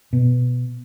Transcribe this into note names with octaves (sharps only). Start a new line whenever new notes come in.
B2